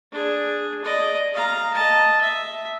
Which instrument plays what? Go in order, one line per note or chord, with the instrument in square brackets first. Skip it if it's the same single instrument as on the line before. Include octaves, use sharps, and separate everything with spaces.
[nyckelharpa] D4 G#4
D5 D#5
F5 A#5
D#5 A5
E5